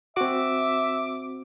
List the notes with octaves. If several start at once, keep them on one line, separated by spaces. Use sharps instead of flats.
C4 F#4 E5 D6